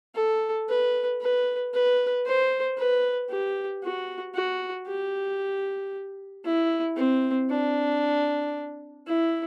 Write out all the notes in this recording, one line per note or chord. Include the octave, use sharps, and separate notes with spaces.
A4
B4
B4
B4
C5
B4
G4
F#4
F#4
G4
E4
C4
D4
E4